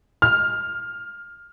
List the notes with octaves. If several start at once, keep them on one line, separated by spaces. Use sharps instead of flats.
F6